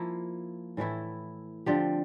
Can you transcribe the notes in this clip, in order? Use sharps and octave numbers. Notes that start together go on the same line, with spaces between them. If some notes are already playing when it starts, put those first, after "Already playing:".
Already playing: F3 A#3 E4
A2 E3 A3 E4
D3 F3 C4 G4